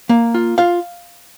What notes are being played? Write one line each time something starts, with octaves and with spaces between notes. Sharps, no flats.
A#3
F4
F4 F5